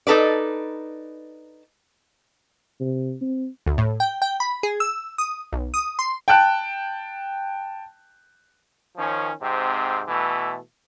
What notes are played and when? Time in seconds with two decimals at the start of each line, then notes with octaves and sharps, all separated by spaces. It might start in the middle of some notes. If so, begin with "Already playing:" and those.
0.07 D#4 A4 B4 D5
2.80 C3
3.21 C4
3.66 D2
3.78 A2
4.00 G5
4.22 G5
4.40 B5
4.63 G#4
4.80 E6
5.18 D#6
5.52 B1
5.74 D#6
5.99 C6
6.28 G5 A5 F#6 D7
8.97 D#3 F3 C#4
9.40 G#2 C3 C4
10.07 B2 E3 A3